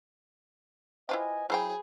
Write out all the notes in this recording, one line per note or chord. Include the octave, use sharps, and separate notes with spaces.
E4 F4 G4 B4 C5 D#5 G#5
F#3 E4 G#4 C5 C#5 G5 A#5 B5